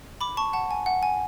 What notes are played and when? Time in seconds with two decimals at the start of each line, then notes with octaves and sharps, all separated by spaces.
0.21 B5 D6
0.37 A5 C#6
0.53 F#5 A5
0.71 G#5
0.86 F#5
1.03 G#5